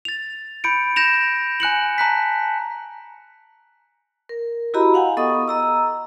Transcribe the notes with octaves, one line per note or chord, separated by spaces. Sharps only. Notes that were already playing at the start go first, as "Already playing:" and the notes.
A6 F7
B5 G6 C#7 D7
G6 A#6 E7 F7
G#5 F#6 C#7 F#7
A5 A#5 F#6 B6
A#4
E4 F#4 G4 D#5 A#5 B5
F5 F#5 G#5
B3 A4 D#5 C#6 D#6
D#5 A#5 E6